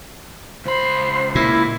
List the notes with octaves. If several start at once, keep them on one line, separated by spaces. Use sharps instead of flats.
C#2 C5 B5
A#2 E4